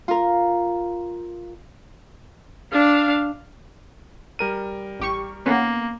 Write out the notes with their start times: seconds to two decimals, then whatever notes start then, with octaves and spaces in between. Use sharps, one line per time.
0.08 F4 A#4
2.72 D4 F5
4.39 G3 A#4 D#7
5.00 A1 G4 C#6
5.46 D#3 A#3 B3 C#4